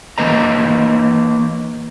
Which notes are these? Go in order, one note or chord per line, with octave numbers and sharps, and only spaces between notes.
E3 A#3 B4 D#5 A#5